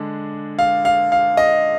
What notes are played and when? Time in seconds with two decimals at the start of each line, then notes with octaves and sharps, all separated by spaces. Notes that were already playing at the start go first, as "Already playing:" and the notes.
Already playing: D3 G#3 D4
0.59 F5
0.85 F5
1.12 F5
1.37 D#5